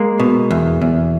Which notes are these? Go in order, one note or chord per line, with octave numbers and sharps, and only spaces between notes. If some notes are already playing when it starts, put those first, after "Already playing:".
Already playing: G#3 A#3
B2
E2
E2